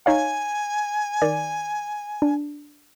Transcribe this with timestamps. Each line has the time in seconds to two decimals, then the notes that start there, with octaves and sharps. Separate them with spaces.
0.06 D#4 C#5 F5 G#5
1.22 D#3 D5
2.22 D4